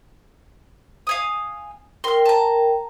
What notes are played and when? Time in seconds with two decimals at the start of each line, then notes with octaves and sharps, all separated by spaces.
1.07 F5 G#5 D#6
2.04 A#4 G5 C6 F6
2.25 A5 A#5